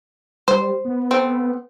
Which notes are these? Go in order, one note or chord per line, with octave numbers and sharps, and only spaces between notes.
G3 C5
B3
A3 C4